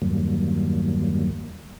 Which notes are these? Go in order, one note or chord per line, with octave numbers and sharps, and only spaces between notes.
E2 G2 D#3 F#3 G3 A#3